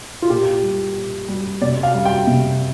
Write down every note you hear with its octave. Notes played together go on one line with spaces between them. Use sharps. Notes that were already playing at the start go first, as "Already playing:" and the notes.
F4
A#2 G4
G3
A#2
G3
C3 D5
F5
G3
G5
C3